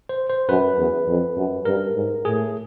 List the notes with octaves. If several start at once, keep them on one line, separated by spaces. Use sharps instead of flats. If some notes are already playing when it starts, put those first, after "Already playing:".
C5
C5
F#2 B4
E2
F2
F#2
G2 A#4
G#2
A2 G#4